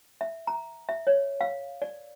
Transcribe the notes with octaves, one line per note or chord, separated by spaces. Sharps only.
E5
A#5
E5
C#5
F5
D5